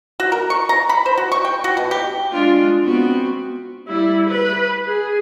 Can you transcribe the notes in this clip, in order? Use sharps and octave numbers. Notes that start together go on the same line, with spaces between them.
F#4
A#4
C#6
A#5
B5
C5
F#4
C#6
G5
F#4
B2
G4
G#3 D4 F4
B3 C4 F#4
G3 E4
B4
G#4